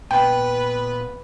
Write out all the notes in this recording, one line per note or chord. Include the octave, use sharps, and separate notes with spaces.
A#2 B3 B4 G5